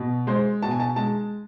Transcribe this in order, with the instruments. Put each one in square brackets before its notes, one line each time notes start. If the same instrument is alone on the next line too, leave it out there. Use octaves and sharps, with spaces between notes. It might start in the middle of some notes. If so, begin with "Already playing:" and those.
Already playing: [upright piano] B2
G#3 C5
B2 A5
G#5
A5
G#3 A5